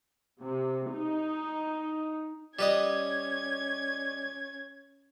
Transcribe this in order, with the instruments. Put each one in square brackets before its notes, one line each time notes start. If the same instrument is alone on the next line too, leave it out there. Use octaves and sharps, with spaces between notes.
[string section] C3
D#4
[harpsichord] G3 B4 D#5 [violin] C#4 G#6